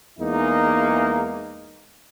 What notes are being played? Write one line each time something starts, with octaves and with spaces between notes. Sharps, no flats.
E2 G#3 A#3 D#4